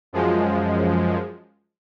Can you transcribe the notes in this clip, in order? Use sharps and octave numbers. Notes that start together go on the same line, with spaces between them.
F#2 F3 G#3